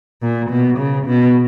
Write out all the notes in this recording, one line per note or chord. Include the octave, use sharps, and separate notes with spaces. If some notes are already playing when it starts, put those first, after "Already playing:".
A#2
B2
C#3
B2